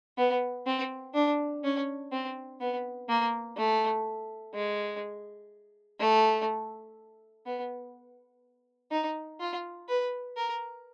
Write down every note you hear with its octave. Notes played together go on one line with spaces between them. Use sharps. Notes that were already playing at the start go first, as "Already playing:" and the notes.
B3
C4
D4
C#4
C4
B3
A#3
A3
G#3
A3
B3
D#4
F4
B4
A#4